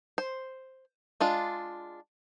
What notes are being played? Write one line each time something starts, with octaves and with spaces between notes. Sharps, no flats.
C5
G#3 D4 F4